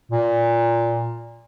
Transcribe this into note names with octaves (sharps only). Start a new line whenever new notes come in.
A#2